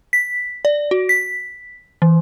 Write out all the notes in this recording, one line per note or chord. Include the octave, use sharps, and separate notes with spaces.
B6
D5
F#4
B6
E3